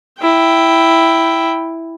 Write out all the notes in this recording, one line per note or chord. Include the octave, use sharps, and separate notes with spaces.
E4 G5